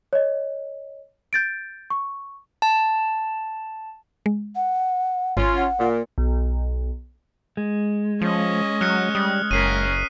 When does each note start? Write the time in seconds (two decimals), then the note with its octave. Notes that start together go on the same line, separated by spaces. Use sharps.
0.13 C#5 D#5
1.33 G6 A6 D7
1.90 C#6
2.62 A5
4.26 G#3
4.56 F#5
5.37 G#1 C#4 F4
5.57 F#5
5.79 A#2
6.18 B1
7.57 G#3
8.21 F3 C#4 D#5
8.81 F#3 F6 F#6 C#7
9.15 G3 D#6
9.51 F#1 C#4 A#4 B6 C7 D#7